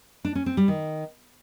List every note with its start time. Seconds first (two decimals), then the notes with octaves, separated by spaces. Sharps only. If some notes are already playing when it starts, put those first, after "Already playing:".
0.25 D4
0.35 C#4
0.46 C4
0.57 G3
0.68 D#3